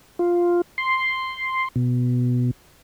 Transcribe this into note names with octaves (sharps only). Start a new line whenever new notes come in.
F4
C6
B2